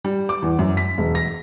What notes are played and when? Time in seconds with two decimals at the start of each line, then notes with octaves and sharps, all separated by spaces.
0.05 G3
0.29 D6
0.42 E2
0.59 F#2
0.77 B6
0.98 E1
1.15 A#6